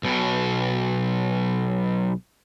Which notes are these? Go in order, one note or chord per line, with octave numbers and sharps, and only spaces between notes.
B1 B2